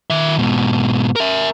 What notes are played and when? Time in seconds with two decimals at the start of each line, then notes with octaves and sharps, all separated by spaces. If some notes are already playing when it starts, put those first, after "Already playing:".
0.10 D#3 E5
0.38 G#2 B2
1.16 A#4 E5